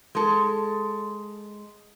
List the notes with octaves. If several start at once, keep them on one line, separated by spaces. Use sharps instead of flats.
G#3 A4